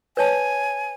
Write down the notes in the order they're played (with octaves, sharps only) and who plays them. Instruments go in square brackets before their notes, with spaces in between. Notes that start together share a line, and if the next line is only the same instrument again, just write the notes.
[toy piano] B4 C#5 A5 [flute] G#5